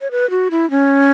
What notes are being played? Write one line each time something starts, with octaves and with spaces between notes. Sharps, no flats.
C#5
B4
F#4
E4
C#4